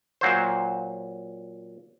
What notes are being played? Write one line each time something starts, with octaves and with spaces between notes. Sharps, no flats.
A#2 F#3 C5